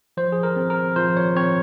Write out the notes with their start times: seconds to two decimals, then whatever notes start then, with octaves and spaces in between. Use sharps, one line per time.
0.17 F3 C5
0.32 G#4
0.43 A#4
0.56 C4
0.70 A#4
0.96 F3 C5
1.17 C#5
1.36 C4 C#5